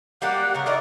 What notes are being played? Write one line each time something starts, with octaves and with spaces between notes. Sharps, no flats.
G3 A#3 G4 F#5
C#3 A#4
D#4 E4 A#4 D5